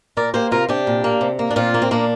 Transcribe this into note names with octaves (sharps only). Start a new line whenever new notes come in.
A#2 A#4 D5
A#3 G4 C5
C3 F4 A#4
C3 D4 G4
A#2
A#3
C3
A#3
D4
A#2 C4 F4
A#3
C4
A#2 A#3 D4